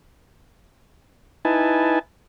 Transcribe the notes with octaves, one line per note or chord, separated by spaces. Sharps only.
D#4 E4 B4 G#5 A5